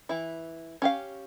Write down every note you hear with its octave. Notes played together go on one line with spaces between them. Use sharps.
E3 E4
C#4 G4 F5